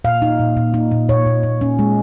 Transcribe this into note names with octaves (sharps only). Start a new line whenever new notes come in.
A#2 F5
D#4
A#2
A#2
D#4
A#2
A#2 C#5
A#2
A#2
C#4
G#3